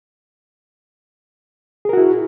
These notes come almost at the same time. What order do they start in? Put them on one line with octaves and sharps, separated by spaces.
G#4 A#4 F#4 E4